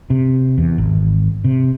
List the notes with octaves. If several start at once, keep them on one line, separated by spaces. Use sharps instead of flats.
C3
E2
G#1
C3